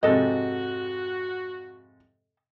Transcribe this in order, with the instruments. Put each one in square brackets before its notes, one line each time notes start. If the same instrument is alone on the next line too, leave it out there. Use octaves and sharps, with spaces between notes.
[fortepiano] F2 G#2 C3 [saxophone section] F#4 [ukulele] A4 D#5